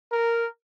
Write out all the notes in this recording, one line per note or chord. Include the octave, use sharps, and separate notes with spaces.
A#4